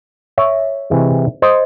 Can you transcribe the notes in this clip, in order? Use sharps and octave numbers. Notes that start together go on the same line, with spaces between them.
C#5 E5
C3 E3 G#3
C5 D#5